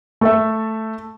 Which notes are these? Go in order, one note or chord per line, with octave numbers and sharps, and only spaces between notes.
A3 A4 E5